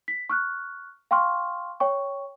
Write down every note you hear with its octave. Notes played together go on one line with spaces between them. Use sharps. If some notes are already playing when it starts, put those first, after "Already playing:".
B6
C#6 F6 F#6
F5 G5 C6 C#6 F6
C#5 G5 C#6